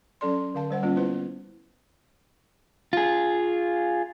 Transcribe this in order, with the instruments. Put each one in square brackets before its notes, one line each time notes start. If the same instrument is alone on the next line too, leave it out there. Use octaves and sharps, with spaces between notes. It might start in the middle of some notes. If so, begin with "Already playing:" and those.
[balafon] F#3 C#4 A4 D5 C6
D3 F5 A5
G3 C5 F#5
G3 A#3 B3 C#4 F4
B3 E4 B4 C5
[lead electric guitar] F4 G#4